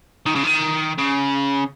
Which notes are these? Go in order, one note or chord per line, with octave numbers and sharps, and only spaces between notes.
D#3
C#3
D#3
C#3